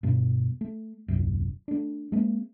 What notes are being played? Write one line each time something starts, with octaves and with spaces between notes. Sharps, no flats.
G2 B2
A3
D#1 C2 F#2
A3 D4
G#3 A#3 C4